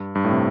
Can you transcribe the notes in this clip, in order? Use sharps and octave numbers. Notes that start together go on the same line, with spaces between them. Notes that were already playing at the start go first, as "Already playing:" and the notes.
Already playing: G2
G2
A2
C3